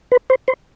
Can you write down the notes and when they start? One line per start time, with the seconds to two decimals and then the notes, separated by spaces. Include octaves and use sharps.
0.12 B4
0.30 C5
0.48 C5